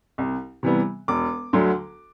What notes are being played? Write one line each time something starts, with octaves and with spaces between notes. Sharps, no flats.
C2
C3 E3 G3 B3
E1 D6
D2 D3 F#3